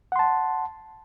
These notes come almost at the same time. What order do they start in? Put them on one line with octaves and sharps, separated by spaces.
F#5 C6 A5